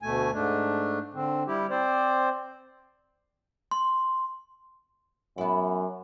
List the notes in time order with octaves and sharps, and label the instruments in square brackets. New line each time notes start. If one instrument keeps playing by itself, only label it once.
[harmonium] D2 B2 A3 G#5
G#2 A3 D4
D3 C4
G3 E4 G4
C4 C5 D5
[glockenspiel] C6
[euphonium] F#2 [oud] B3 E4